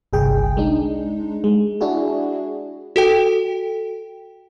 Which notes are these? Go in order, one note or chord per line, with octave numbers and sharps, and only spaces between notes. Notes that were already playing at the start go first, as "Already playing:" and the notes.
G1 C2 G#4 G5
G#3 D4 D#4
G#3
D4 E4 F#4 G#4
F#4 A4 G5